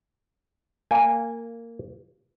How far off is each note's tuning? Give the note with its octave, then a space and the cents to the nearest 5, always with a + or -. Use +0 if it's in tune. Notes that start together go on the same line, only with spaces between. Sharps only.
A#3 -15 G#5 -15